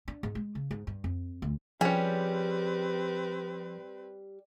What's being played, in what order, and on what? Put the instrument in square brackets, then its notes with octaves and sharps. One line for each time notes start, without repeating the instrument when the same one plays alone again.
[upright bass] D4
G#2
G#3
C#3
G#2
G2
F2
D2
[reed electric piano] F3 [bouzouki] G3 [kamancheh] C4 B4 [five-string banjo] C#4 G#4